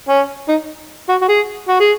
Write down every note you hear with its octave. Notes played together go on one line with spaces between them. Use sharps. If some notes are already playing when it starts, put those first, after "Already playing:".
C#4
D#4
F#4
F#4
G#4
F#4
G#4